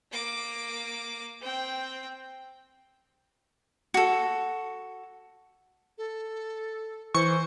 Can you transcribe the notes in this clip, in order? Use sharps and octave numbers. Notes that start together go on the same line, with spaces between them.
A#3 D6
C4 G5
F#4 A4
A4
E3 C5 C#6 C#7